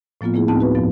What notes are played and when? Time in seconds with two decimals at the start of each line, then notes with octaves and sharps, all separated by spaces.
0.21 A2 F3 A#3 B3 F4
0.34 A3 B3 E4 G#4
0.48 D2 A2 B3 C4 D#4 A5
0.60 F#4 B4
0.75 G2 F3 B3